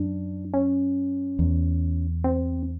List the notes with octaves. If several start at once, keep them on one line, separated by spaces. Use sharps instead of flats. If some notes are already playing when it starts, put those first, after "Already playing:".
Already playing: F#2 D4
C#4
E2
C4